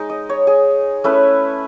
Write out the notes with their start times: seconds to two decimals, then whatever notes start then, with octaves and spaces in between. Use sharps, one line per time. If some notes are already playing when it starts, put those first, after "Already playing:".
Already playing: G#3 D#4
0.09 D#5
0.29 C#5
0.47 G#4
1.04 A3 C#4 E4 B4